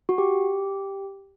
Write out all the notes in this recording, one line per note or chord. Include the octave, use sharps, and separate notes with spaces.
F#4
G4